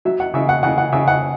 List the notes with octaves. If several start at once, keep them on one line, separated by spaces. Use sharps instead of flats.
F#3 E5
F#5
C#3 E5
F#5
C#3 F#5
F#5
C#3 E5
F#5